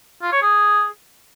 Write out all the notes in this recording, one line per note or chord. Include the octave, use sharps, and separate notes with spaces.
F4
C#5
G#4